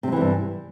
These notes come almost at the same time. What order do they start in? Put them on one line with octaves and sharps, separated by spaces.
C3 F#3 E3 E2 G2